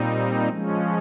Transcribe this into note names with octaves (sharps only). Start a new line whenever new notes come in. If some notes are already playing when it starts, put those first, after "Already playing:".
Already playing: A#2 G3 C4 D#4
F3 G#3 C#4